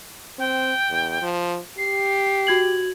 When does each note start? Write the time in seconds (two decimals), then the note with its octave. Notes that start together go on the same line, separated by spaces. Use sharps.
0.38 C4 G5
0.90 E2
1.22 F3
1.77 G4 C7
2.47 F#4 G#6 F#7